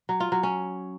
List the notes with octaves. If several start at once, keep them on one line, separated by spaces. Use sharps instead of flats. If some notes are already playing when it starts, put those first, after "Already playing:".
F#3
F4
F#3
C#4